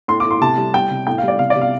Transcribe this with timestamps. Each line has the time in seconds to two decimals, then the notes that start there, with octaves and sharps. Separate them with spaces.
0.08 A2 C6
0.20 D6
0.26 A2 C6
0.41 C3 A5
0.58 G3
0.74 G3 G5
0.91 C3
1.07 A2 G5
1.18 F5
1.24 G3 D5
1.39 C3 F5
1.50 D5
1.55 C3
1.61 F5